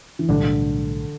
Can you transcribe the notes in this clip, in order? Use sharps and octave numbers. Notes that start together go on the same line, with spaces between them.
E3
B1 A2 D3 G3 D4